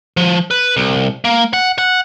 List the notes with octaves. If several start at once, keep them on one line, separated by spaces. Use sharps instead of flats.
F3
B4
C2
A#3
F#5
F#5